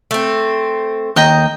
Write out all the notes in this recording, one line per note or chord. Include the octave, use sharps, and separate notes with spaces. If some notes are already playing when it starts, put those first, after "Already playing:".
A3 C4
D#2 D#5 G5 A#5